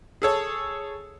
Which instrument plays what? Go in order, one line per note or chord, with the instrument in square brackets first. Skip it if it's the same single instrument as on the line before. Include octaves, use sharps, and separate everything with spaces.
[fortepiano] G#4 A4 C#5